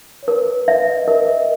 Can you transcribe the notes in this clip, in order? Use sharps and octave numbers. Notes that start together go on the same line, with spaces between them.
C#5
A#4 B4
B4 E5
D#5
A#4 E5
D#5